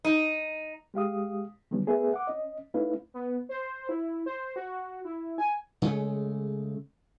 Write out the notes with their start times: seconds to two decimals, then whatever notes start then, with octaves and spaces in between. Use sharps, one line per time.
0.05 D#4
0.94 G#3 G4 F5 D#6
1.71 D3 D#3 F#3 G3 B3 C#4
1.87 A3 B3 G#4 A#4 B4 E5
2.14 F#5 D6
2.27 C#4 D#5
2.74 A3 C#4 D#4 E4 B4 F5
3.14 B3
3.49 C5
3.89 E4
4.26 C5
4.56 F#4
5.05 E4
5.38 G#5
5.82 C#3 G#3 A3